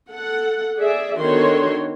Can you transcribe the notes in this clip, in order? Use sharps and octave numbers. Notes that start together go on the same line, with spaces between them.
A4 F#5
G#4 D5 E5
D3 D#3 B3 F#4 C#5 C6